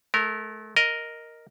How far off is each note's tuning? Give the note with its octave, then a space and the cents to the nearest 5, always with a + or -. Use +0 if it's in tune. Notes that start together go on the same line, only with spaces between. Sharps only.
A3 -35 A#4 -15
A#4 +0 D#5 +0